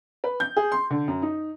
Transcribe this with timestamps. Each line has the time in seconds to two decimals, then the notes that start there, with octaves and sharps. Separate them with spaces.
0.24 B4
0.40 G6
0.57 G#4
0.72 C6
0.90 D3
1.08 F#2
1.22 D#4